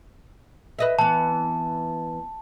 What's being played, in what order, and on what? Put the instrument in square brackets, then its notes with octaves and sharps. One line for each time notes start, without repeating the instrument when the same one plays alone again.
[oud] B4 D#5 E5
[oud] E3 B3 [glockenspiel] A5